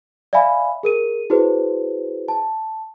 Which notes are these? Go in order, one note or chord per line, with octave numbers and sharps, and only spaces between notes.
D5 E5 F5 G#5 B5
G#4 A#4 D#7
E4 F#4 G#4 B4 C5
A5